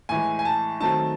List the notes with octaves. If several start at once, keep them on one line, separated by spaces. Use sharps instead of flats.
A2 E3 G#3 G#5
G#5
A5
D#3 F#3 A3 C4 A5